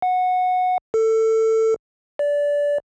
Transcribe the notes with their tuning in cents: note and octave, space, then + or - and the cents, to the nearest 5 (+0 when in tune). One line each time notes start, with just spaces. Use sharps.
F#5 -15
A4 +20
D5 -20